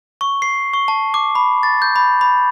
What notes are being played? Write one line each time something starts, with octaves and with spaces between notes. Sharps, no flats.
C#6
C7
C#6
A5
D6
B5
A6
G6
B5
B5